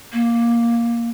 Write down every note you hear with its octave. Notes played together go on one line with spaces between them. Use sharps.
A#3